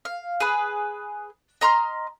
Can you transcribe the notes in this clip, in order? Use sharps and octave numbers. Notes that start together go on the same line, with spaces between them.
F5
G#4 B4
D#5 A#5 C6 F6